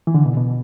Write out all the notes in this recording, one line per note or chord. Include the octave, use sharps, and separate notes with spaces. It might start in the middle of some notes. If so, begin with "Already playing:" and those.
E3
D3
B2
B2